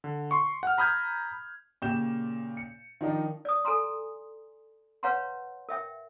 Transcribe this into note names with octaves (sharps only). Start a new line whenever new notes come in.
D3
C6 C#6
F#5 F6
A#5 B5 D#6 F6 G6 G#6
A#2 C#3 G4 G6 E7
C#7
D#3 F3 D4 D#4
D5 D#6
A4 G#5 A#5 C6
B4 C#5 F5 F#5 A#5 C6
A#4 E5 G5